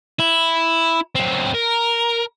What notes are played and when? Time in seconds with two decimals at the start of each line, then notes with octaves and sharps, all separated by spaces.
0.19 E4
1.15 F#3 C4
1.54 A#4